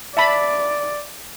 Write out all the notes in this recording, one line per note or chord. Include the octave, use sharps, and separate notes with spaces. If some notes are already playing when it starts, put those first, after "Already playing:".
D5 E5 A5 B5